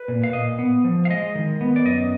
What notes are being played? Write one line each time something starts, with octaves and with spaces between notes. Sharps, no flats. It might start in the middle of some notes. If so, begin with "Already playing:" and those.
Already playing: B4
A#2
F5
A#2 D#5
B3
F3
F5
G#3 D#5
D#3
B3
D5
F#2 D#5